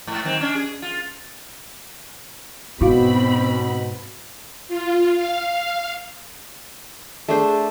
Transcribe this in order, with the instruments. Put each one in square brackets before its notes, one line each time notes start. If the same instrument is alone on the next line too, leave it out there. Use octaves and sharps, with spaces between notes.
[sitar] G#2
D#3 F#3 C4
C#4 D4
G#4
F4
[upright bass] G#2 [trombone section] B2 [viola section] C4 B5 [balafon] E4 F#4 F5
[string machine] F4
F5
[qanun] A3 D4 C5 [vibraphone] G#4 A4